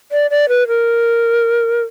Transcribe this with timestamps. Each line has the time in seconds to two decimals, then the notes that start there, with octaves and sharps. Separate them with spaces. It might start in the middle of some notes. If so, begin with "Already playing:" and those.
0.12 D5
0.31 D5
0.49 B4
0.68 A#4